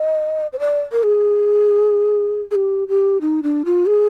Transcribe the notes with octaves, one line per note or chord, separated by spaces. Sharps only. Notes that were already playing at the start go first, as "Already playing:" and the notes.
Already playing: D#5
C5
D5
A#4
G#4
G#4
G4
G4
D#4
D4
F4
G#4